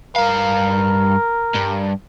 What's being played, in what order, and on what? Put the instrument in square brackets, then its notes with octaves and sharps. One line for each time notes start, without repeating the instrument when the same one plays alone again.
[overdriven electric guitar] G2 F5 [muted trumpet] A#4
[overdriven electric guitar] G2